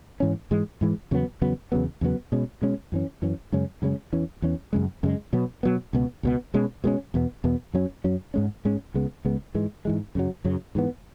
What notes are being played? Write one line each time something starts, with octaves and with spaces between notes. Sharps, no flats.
G#2 E3 C#4
G#2 E3 G#3
G#2 E3 G#3
E2 C#3 F#3 B3
E2 C#3 F#3 B3
E2 C#3 F#3 B3
E2 C#3 F#3 B3
B2 G#3 C#4
B2 G#3 C#4
F#2 E3 C#4
F#2 E3 C#4
F#2 C#3 G#3 C#4
F#2 C#3 G#3 C#4
E2 E3 C#4
E2 E3 C#4
F#2 C#3 G#3
F#2 C#3 G#3
B2 F#3 B3
B2 F#3 B3
C#2 B2 B3
C#2 B2 B3
B2 G#3 C#4
B2 G#3 C#4
E2 B2 B3
E2 B2 B3
F#2 F#3 C#4
F#2 F#3 C#4
G#2 G#3 C#4
G#2 G#3 C#4
C#2 C#3 G#3 B3
C#2 C#3 G#3 B3
G#2 E3 G#3
G#2 E3 G#3
F#2 C#3 F#3
F#2 C#3 F#3
G#2 E3 B3